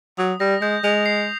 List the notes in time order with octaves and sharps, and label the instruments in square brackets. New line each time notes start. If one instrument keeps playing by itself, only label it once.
[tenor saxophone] F#3 [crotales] D#6
[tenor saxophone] G3 [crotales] A#6
[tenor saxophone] G#3 [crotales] G6
[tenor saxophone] G#3 [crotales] F7
[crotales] C7